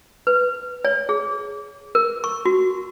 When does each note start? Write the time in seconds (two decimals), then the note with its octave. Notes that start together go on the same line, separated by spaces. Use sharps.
0.27 B4
0.85 C#5
1.09 G#4
1.95 A#4
2.24 C#6
2.46 F#4